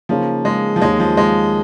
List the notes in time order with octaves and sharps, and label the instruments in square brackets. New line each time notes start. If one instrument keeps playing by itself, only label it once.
[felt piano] C#3 A#3 D#4 G#4 C#5 [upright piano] F3
[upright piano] G#3
F3
[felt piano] D#2 D#3 A#3 F4 C#5 [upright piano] G#3
[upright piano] F3
G#3